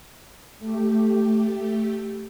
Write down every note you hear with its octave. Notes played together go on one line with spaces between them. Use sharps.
A3 G4